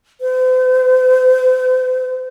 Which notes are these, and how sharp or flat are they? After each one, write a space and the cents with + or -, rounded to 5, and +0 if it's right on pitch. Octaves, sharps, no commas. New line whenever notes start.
C5 -45